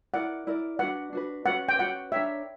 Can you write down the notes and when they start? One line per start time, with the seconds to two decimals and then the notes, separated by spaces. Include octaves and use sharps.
0.14 E4 A#4 D5 F#5
0.47 E4 A#4 D5
0.79 D4 F#4 B4 F#5
1.13 D4 F#4 B4
1.46 C#4 F#4 B4 F#5
1.69 G5
1.78 C#4 F#4 B4 F#5
2.12 D4 A#4 C#5 E5 G5